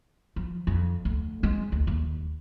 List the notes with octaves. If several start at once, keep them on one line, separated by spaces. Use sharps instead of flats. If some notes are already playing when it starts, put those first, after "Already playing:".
F3
F2
D2
G#3 C4
D2
D#2